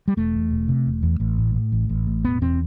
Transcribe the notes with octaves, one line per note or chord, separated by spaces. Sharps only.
G3
E1 A3
E2
E1
C3
E1
E2
A1
A2
A2
A1
A1
A2
E1 B3
E2 C4